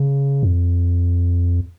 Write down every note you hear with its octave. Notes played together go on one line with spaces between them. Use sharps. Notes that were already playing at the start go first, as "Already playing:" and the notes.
Already playing: C#3
F2